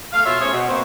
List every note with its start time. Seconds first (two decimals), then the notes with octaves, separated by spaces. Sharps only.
0.13 A3 F5
0.25 B2 F4 C#5 E5
0.41 A3 C#4 G#4 A4 C5 C#5
0.53 B2
0.68 A#3 C4 F#4 B4 C5